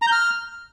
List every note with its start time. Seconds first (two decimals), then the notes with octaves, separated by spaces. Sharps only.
0.02 A#5
0.07 G6
0.12 F6